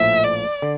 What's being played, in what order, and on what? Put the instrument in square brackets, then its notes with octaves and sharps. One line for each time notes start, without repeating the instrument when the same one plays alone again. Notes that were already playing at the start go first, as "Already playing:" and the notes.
Already playing: [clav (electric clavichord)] A#1 A2 F3 [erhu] E5
[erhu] D5
[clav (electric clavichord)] D3